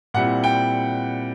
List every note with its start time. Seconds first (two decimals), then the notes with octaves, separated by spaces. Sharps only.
0.14 A#2 G3 C4 E4 F#5
0.44 G5